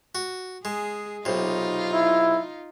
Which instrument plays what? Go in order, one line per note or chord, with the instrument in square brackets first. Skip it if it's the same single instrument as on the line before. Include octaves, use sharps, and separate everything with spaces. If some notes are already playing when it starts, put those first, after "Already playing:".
[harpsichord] F#4
[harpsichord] G#3 [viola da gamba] G#4
[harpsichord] B1 C3 [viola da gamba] D#4 F4
[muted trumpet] E4